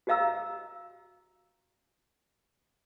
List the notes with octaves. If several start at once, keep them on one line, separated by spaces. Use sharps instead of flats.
F#4 G4 D#5 F5 A#5 E6